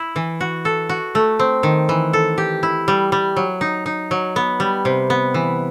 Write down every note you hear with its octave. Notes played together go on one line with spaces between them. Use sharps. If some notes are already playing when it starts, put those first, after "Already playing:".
Already playing: E4
E3
F#4
A4
F#4
A3
C4
D#3
E3
A4
G4
E4
G3
G3
F#3
D#4
D#4
F#3
B3
G3
C3
B3
E3